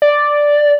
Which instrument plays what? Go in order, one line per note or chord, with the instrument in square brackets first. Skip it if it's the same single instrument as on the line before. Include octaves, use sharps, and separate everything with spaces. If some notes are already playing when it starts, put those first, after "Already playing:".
[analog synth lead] D5